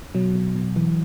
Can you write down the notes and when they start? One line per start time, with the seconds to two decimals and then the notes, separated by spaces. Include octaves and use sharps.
0.15 B2 F#3
0.35 B2
0.56 B2
0.76 E3